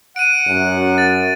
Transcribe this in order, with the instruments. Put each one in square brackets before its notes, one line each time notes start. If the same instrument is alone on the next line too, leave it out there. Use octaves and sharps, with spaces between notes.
[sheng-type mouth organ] F#5 [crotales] D7 D#7
[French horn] F#2
[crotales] A6